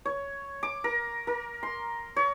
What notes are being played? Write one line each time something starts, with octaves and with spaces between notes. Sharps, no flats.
C#5
D6
A#4
A#4
C6
C#5